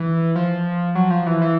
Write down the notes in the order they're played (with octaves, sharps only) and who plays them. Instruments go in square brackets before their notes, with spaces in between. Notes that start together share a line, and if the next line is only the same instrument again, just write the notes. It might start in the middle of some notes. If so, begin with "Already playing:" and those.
Already playing: [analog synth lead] E3
F3
F#3
F3
E3
E3